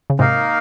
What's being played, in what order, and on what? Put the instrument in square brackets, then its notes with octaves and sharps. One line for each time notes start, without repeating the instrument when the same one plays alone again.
[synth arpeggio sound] C#3
[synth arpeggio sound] G#2 C3 [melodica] A#3 D#4 A#4 F5